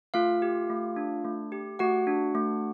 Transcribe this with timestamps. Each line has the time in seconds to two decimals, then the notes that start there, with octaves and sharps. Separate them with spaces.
0.14 A3 F4 F5
0.42 G4
0.70 A3
0.96 D4
1.25 A3
1.52 G4
1.79 A3 F#4 F#5
2.07 D4
2.35 A3